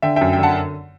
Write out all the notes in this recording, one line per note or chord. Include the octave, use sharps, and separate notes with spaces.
D3 E5 G5
F#2 E5 G5
G5
D3 F#5 A5